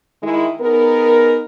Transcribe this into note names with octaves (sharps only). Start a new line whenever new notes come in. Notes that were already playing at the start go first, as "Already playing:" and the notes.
D#3 G#3 E4
B3 D#4 G#4 A#4